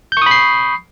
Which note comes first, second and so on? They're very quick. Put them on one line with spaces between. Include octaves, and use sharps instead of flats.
G6 C#6 D#6 B5 C7